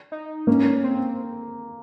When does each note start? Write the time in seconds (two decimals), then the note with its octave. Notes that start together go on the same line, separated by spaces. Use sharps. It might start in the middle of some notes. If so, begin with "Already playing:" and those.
0.12 D#4
0.47 A#3 C#4
0.84 C4